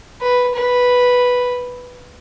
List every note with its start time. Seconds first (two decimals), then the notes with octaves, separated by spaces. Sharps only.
0.21 B4
0.55 B4